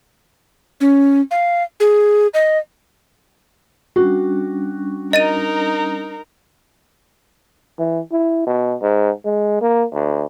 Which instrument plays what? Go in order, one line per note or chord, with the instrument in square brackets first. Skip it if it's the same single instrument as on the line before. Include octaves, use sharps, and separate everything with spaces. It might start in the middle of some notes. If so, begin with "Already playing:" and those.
[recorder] C#4
F5
G#4
D#5
[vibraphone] G3 C#4 D4 [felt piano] F#4
[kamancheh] D#4 A#4 [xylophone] D#5 A6 D#7
[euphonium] E3
E4
B2
G#2
G#3
A#3
D2